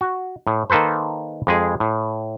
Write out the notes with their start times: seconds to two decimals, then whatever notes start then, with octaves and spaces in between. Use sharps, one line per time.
0.01 F#4
0.47 A2
0.70 D#3 A#3 A4 B4 C5
1.47 F2 G#3 G#4
1.80 A2